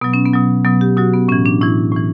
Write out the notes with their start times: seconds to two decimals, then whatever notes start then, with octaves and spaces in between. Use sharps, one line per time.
0.01 B2 F#3 B3
0.14 C#4
0.25 B3
0.33 B2 F#3
0.65 B2 F#3 B3
0.81 G4
0.97 B2 F#3 F#4
1.14 B3
1.28 A2 E3 C#4
1.46 D4
1.61 A2 E3 E4
1.92 A2 E3